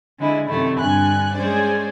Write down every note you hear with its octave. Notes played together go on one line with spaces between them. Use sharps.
D3 G#3 E4
F#2 C3 D#3 F3 A3 E4
G2 D3 G#5 F#6
G#3 C#4 G#4 C5 D5